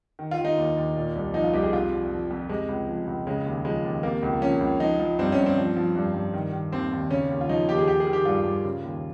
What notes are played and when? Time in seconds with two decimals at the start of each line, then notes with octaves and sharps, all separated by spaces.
0.19 D#3
0.31 F4
0.38 D#3
0.45 D#4
0.58 D#2
0.77 D#2
0.96 A#2
1.15 C2
1.34 F3 D#4
1.44 F4
1.53 C2 G4
1.63 G#4
1.73 C3 F4
1.92 F2
2.11 F3
2.31 F2
2.49 C3 G#3
2.69 C#2
2.88 F3
3.07 C#2
3.27 C#3 G#3
3.46 D#2
3.65 F3 G#3
3.84 D#2
4.03 C3 A#3
4.23 C#2
4.42 F3 C#4
4.60 C#2
4.80 F3 D#4
4.99 F3
5.18 G2 C4
5.32 C#4
5.38 G2
5.46 C4
5.57 F3
5.77 F3
5.95 G2
6.14 G2
6.34 D#3
6.53 D#3
6.72 D#2 C4
6.91 D#2
7.11 C#3 C#4
7.30 D#2
7.41 F4
7.49 F3 D#4
7.68 D#2 G4
7.78 G#4
7.88 D#3 G4
8.00 G#4
8.07 D#3
8.13 G4
8.25 G2 F4
8.45 G2
8.64 C#3
8.84 D#2